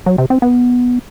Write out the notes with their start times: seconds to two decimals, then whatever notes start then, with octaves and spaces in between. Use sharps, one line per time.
0.06 F#3
0.18 C3
0.30 C4
0.42 B3